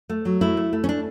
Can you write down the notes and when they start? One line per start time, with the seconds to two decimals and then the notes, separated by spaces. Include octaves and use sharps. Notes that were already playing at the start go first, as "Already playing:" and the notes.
0.09 A3
0.25 F#3
0.41 A3 E4
0.57 A3
0.73 A3
0.84 C#4
0.89 D4